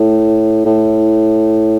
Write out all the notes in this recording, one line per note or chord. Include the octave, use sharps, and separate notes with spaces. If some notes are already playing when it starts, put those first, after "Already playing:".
Already playing: A2
A2